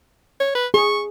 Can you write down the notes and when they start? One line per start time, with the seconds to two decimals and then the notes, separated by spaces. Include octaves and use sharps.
0.40 C#5
0.55 B4
0.74 G#4 C#6